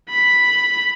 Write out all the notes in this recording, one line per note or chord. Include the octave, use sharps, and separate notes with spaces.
B5